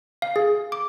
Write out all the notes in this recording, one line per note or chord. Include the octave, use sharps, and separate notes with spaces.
F5
G#4
D6